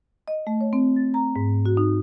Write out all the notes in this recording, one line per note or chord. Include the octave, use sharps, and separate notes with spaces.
D#5
A3
C#5
C4
A6
A#5
G#2
F#4
D#4